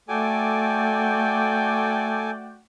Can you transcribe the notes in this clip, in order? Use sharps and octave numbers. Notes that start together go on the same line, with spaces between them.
A3 F#4 A4 D5 G5 G#5 D6